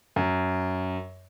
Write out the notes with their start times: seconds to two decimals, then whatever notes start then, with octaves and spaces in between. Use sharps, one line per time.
0.16 F#2